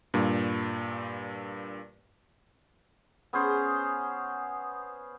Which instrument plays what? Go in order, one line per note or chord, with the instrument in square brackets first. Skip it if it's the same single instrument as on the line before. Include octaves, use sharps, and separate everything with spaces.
[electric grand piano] G2 A#2
[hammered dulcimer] B3 C#4 G#4 C5